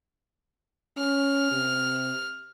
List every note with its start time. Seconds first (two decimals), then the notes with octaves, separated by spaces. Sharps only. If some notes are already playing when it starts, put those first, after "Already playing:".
0.97 C#4 F6
1.51 C3